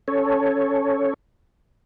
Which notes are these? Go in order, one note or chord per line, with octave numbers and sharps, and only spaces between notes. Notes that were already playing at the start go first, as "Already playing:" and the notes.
C#4 A4 C#5